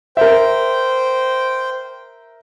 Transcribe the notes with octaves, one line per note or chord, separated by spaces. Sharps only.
A#4 C5 E5 G5